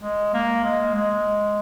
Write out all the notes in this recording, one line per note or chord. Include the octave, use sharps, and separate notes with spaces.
G#3
A#3
G#3
G#3